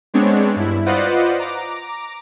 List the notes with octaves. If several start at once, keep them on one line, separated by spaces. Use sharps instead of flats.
G#3 B3 C4 D4 C#5
G2 E4
F4 B4 C5 D5 D#5 F#5
A#5 D6